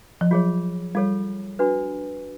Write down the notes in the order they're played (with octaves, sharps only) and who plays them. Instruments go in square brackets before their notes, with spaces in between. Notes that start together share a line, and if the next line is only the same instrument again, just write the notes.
[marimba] F3
[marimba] F#3 [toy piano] F4 G#4 C#5
[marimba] G3 [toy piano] F4 A4 C#5
[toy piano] D4 F#4 B4